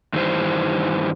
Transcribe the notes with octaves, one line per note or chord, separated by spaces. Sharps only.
G2 D#3 E3 G3 C5